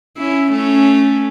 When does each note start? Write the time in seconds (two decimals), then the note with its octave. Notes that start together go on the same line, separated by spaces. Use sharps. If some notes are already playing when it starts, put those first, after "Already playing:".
0.18 C#4 E4
0.51 A3 C#4